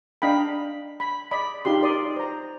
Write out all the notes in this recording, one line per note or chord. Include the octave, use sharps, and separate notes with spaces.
D4 D#5 F5 G5 A#5 B5
B5
D5 D#5 B5
D#4 F4 G4 C6
A#4 D5 C6 D#6
C5 A#5